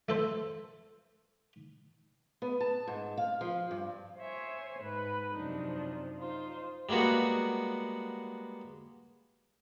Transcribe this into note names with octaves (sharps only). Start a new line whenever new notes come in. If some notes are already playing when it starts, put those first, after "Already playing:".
A3 A4 C5
B3
A5
G#2
F5
F3
G2
C5 C#5 E5 G#5
G#2 B4
F#2 C3 F3 D4 D#4
D#4 F4 C5
G3 G#3 A#3 B3 F#4